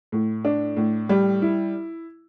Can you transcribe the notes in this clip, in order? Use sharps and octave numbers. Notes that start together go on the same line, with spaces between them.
A2
D4
A2
G3
E4